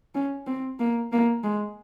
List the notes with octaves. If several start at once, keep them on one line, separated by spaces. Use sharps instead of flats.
C#4
C4
A#3
A#3
G#3